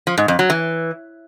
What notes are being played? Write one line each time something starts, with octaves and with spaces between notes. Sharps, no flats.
F3
G#2
F2
F#3
E3